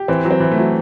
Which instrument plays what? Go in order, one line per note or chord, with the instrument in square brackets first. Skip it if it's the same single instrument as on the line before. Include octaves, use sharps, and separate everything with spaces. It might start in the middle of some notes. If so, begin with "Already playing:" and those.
Already playing: [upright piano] G4
[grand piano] E3 [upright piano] C4
[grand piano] F#3
[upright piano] C4
[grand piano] E3
[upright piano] A3
[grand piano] F#3